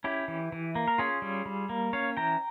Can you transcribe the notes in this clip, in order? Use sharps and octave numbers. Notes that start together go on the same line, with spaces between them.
C#4 E4 G4
E3
E3
A#3
A#4
C#4 F4 G#4
G3
G3
A#3
C#4 C#5 F5
E3 G5 A#5